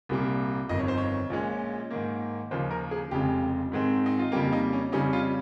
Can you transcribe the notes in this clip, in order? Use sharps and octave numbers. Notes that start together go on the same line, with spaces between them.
C2 A#2 G3 A#3
G1 F2 D#3 D#5
C#5
C5
C#5
A#1 A#2 G#3 C#4
G#2 D#3 A#3
D#2 C#3 F3 C5
A#4
G#4
F1 F2 C#3 G#3 G4
G#2 D#3 G#3 C4
D#4
F4
F2 C#3 G3 A#3 G4
D#4
C#4
F2 C#3 G3 C#4 D#4
F4